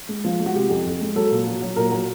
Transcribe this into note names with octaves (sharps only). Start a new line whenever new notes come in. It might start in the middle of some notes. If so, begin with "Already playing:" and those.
G#3
F3
G#3
F#4
C3 G4
F2
F2
G#3
F#3 A4
A#2
F#3
F#3
A#2 A#4
F#3